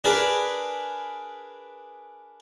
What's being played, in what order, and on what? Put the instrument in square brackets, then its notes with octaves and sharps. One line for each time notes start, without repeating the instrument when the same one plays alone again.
[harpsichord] D4 G#4 A#4 B4 D5